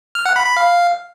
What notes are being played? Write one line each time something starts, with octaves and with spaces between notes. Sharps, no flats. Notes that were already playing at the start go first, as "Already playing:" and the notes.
F6
F#5
B5
B5
F5